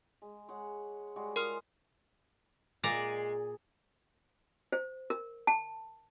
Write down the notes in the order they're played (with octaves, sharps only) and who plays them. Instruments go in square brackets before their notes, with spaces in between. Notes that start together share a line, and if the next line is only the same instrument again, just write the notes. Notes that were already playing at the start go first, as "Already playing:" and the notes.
[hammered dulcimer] G#3
G#3 C#5 F#5
G3 G#3 F#4
[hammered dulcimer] F4 [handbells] A#4 C6 F6
[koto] A#2 D5 A#5 [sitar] G#3
[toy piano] C5
A#4
A5